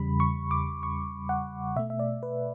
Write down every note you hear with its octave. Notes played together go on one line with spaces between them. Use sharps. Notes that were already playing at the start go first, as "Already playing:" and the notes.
Already playing: E2 C#3 G3 B5
C#6
D6
C#6
F#5
B2 A3 E5
E5
D5
B4